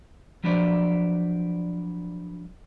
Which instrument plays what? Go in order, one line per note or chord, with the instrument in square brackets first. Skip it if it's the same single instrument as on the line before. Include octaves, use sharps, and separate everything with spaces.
[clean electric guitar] F3 F#3 D4 B4 C5 D5